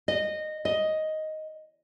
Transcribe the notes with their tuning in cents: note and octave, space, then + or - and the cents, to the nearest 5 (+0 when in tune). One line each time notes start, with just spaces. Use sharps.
D#5 -15
D#5 +5